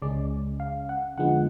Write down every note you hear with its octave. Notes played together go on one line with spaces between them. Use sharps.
C#2 C#3 G#3 C#4 D5
F5
F#5
F2 D3 F3 G#3 B3 F#5